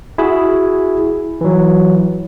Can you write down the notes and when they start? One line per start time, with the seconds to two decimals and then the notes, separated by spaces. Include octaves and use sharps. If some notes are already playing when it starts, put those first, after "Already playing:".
0.18 E4 F#4 G#4
1.41 E3 F#3